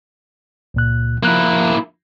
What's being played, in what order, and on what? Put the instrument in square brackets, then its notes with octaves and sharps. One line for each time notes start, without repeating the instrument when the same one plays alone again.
[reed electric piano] C#2 A#2 F#6
[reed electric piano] F3 F#6 [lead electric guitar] A#3 E4